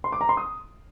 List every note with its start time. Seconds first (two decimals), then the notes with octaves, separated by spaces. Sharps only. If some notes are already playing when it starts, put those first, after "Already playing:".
0.04 C6
0.12 D6
0.21 A#5
0.29 C6
0.37 D#6